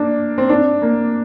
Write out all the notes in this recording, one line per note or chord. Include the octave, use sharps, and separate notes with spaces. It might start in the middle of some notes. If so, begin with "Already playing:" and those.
Already playing: A#3 D4
C4
D4
A#3